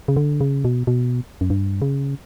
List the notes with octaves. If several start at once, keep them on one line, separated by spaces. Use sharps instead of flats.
C#3
D3
C#3
B2
B2
F#2
G2
C#3